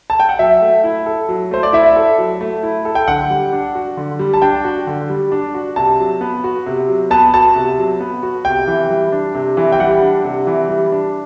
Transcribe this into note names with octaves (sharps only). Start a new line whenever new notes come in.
A5
G5
F#5
F#3 E5
A3
E4
A4
F#3
A3 C5
D5
E4 E5
A4
F#3
A3
E4
A4
G5
D3 F#5
G3
D4
F#4
D3
G3
A5
D4 G5
F#4
D3
G3
D4
F#4
C3 A5
F#3
B3
F#4
C3
F#3
B3 A5
F#4 A5
C3
F#3
B3
F#4
C3 G5
E3
G3
D4
C3
E3
G5
G3 F#5
D4
C3
E3
G3
D4